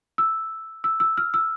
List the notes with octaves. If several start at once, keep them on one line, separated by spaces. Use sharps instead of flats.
E6
E6
E6
F6
E6